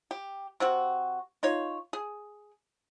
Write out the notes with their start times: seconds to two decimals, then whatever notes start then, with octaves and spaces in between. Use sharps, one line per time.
0.11 G4
0.60 C3 C4 F#4
1.43 D#4 F4 C#5
1.93 G#4